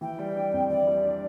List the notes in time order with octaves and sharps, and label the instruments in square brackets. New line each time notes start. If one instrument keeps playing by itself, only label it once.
[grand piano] E3 [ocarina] G5
[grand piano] G3
D4
F2
[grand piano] E3 [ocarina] D5
[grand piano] G3
D4